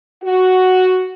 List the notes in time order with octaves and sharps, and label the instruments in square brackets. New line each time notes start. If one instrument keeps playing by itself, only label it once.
[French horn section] F#4